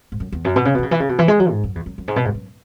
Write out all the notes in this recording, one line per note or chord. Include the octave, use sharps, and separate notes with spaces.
G#2
F#2
E2
F#2
B2
C#3
B2
E3
C#3
E3
C#3
B2
E3
G#3
F#3
G#2
F#2
E2
F#2
F#2
G#2
B2
G#2
F#2